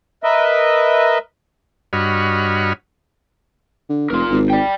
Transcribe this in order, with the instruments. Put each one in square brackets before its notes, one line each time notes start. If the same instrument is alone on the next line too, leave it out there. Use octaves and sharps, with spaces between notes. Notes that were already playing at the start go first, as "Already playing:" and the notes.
[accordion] A#4 B4 D#5 E5
[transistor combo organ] G2 F#4 C#5 D#5 B5 F6
[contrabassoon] D3
[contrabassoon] F1 [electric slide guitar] F4 A#4
[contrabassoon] G#1
[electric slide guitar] D5 G5